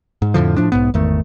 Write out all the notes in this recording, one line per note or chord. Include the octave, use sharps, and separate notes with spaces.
G#2
F2 A2 D3 F3
A2 F3 D4
B1 G#2 B3
G#1 E2 D#3 A3